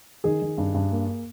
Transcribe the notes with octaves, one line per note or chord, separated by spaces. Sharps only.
D#3 G#4
D#3
G2
G2
A#3